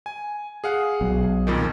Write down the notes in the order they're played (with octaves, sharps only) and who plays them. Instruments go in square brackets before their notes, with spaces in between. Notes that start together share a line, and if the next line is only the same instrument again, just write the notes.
[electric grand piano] G#5
G#4 F5 F#5
[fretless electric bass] B1
[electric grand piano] F2 A#2 D#3